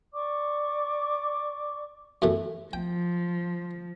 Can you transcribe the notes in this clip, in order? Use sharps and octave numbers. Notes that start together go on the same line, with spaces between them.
D5 C#6 D6
F#2 E3 A3
F3 G5